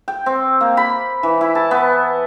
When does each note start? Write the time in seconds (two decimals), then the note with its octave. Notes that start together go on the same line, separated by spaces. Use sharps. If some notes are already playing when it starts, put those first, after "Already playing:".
0.08 G5
0.26 C4
0.61 A#3
0.77 B5
1.23 E3
1.41 E4
1.55 A5
1.71 B3